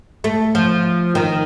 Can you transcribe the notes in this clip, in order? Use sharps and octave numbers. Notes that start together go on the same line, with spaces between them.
A3
F3
D#3